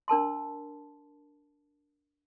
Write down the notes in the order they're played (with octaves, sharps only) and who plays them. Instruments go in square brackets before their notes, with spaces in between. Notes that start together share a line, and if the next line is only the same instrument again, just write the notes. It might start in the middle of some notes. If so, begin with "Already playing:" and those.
[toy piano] D4 A#4 A5 C6